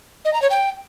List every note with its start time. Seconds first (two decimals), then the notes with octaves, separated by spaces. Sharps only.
0.25 D#5
0.33 A#5
0.42 C#5
0.50 G5